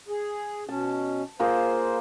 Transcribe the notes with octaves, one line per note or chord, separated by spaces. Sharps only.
G#4
B2 C#4 A5
A#3 F4 G#4 C5